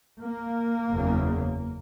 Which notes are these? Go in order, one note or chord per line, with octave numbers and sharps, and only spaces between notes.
A#3
F#1 E2 C#3